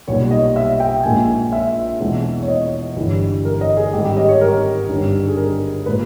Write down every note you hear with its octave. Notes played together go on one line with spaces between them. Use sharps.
B1 A#2 G3 C#5
D#5
E5
G5
A#1 A#2 G#3 G#5
E5
E2 B2 G#3
C#5
D#5
G1 G2 E3 G3
A#4
D#5
G#4
G#1 G#2 D#3 G3 G4
G4
D#5
C#5
A#4
G1 G2 D#3 G3
G#4
A#4
A#2 G#3 B4